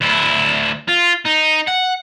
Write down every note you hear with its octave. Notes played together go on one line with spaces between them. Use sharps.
D2 E4
F4
D#4
F#5